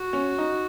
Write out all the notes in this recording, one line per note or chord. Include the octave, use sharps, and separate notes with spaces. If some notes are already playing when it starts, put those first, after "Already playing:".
Already playing: F#4
C#4
D#4